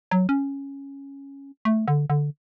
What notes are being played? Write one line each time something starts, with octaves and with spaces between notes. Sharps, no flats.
F#3
C#4
A3
D3
D3